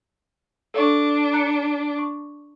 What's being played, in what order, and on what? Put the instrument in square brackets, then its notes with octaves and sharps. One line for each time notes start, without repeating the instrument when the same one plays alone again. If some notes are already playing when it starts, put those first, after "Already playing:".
[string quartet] D4 [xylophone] A4 F5 C#6
[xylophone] A#5 F#6 C#7
C#6